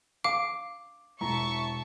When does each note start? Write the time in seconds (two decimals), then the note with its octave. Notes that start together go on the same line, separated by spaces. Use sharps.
0.24 F5 D6
1.21 E1 E4 E5 A5 A#5 C#6